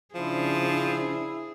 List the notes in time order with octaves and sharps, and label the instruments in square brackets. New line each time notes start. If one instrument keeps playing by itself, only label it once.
[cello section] C#3 D4 C5 [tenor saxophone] F3 [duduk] E4 [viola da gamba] G#4